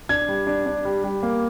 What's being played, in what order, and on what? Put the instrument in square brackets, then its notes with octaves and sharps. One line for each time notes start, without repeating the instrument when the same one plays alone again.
[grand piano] D4 G#6
G3
D4
D4
G3
G3
A#3